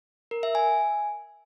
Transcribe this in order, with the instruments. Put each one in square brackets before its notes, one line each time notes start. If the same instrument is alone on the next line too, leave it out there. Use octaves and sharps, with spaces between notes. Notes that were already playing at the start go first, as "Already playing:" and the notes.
[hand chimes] A#4
E5
G#5